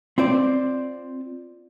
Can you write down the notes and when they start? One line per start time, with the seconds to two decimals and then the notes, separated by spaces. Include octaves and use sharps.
0.18 C4 F4 C5 D5